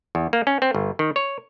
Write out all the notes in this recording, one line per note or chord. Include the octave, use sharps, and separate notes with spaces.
E2
A#3
C#4
C4
G1
D#3
C#5